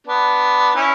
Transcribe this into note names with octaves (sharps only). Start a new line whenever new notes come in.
B3 D4
C#4 E4